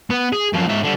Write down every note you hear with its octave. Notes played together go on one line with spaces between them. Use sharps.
B3
G#4
F#2 F3
G#2 E5
D3 G3